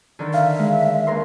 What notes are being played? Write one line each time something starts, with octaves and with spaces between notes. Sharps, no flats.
D3 D#3
E5 F5
G#3
D#2 A#4 C6